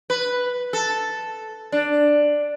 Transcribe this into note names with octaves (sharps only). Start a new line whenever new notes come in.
B4
A4
D4